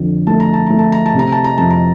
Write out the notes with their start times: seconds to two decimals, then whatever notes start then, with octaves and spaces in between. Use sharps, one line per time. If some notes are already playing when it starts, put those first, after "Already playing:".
Already playing: F2 D3
0.27 A3 A5
0.40 A#5
0.53 A5
0.67 A3 A#5
0.79 A5
0.92 A#5
1.06 A5
1.14 C3 A#5
1.32 A5
1.44 A#5
1.58 F2 A5
1.70 A#5